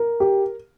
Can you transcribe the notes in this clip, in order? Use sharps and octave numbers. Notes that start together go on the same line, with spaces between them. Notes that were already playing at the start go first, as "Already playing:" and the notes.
Already playing: A#4
G4